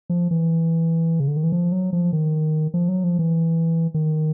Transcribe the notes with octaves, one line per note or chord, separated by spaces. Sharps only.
F3
E3
C#3
D3
D#3
E3
F3
F#3
F3
D#3
F3
F#3
F3
E3
D#3